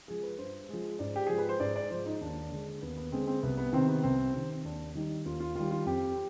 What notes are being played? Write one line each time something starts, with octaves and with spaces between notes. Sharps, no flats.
F3 G#3 G#4
B4
G2 C5
F3 G#3
G#2 D5
G4
F3 G#3 G#4
B4
C5
G#2 D5
D5
F3 G#3 C5
D#4
D#2 D4
D3 G#3
D#2 B3
B3
D3 G#3 C4
C4
C2 B3
B3
C3 D#3 C4
B3
C2 C4
C3 D#3
D#2 D4
D#3 G3 D#4
D#2 F4
F4
D#3 G3 F4
F4
F2 G4